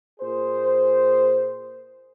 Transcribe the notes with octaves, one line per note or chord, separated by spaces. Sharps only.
A#2 G#4 C5